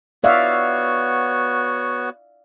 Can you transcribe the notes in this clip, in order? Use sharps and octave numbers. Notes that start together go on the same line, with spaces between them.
B3 F#4 C#5 D5 E5 F5